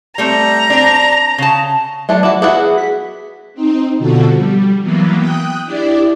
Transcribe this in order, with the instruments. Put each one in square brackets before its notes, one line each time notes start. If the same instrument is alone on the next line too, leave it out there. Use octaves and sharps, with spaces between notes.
[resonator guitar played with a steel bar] G3 A3 C4 [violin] A#5
[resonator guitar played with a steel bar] C4 D4
C#3 A5
[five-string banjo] E3 A3 D4 [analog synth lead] F#3
[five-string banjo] E4 F#4 [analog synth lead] D6
[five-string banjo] B3 E4 F#4 [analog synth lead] G#4
[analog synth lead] B6
[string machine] C4 D#4
B2 D3 F3 F#4 A4
G3
E3 F#3 A#3 B3
G5 D#6 F#6
D4 E4 G4 D5